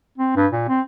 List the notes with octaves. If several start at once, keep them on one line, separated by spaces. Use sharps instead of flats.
C4
G2
A#2
C4